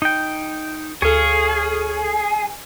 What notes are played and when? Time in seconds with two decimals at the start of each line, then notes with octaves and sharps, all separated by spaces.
0.02 D#4 G5
1.02 D2 G#4 A4 C#5 F5